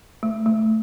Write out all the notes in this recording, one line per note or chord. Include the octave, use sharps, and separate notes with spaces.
A3
A3